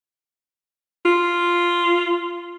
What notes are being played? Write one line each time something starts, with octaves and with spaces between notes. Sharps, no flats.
F4